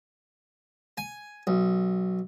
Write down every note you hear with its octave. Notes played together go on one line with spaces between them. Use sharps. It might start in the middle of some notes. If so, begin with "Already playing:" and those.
G#5
B1